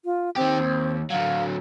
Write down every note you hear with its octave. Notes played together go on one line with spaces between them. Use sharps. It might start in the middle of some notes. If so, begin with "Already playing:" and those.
F4
D#3 C4 G4
D#2
D3 F#3 F5